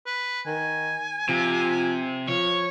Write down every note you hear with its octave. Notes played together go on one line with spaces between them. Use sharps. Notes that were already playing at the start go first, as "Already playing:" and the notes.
B4
D#3 G#5
C3 F3
F3 C#5